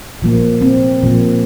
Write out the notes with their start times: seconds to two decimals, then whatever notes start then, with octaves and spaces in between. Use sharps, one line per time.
0.22 A#2 F3 A#3
0.61 C4
1.03 A#2 F3 A#3